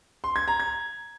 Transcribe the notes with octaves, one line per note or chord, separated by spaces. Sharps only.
C6
G#6
A#5
G#6